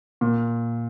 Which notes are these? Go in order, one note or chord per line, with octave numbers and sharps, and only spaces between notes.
A#2